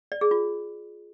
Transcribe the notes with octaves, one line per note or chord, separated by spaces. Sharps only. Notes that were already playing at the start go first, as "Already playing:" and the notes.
D5
G#4
F4